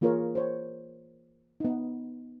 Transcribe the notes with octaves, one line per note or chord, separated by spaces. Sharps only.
E3 A#3 F4 G#4 A#4 C#5
C5 C#5
B3 D#4